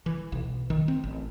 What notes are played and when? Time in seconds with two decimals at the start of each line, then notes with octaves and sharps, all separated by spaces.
0.06 E3
0.32 B1
0.70 D#3
0.88 C4
1.04 A1